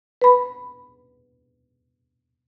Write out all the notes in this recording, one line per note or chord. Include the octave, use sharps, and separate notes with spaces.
B4 B5